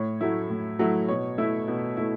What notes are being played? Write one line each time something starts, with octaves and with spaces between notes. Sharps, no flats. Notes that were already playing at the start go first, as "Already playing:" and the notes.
Already playing: A2 C#5
F#3 A3 E4
A2
F#3 A3 E4
B2 C#5
A3 E4
B2
A3 E4